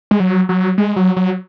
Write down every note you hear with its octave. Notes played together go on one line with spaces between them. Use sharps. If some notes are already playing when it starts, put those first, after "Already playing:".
G#3
F#3
F#3
G#3
F#3
F#3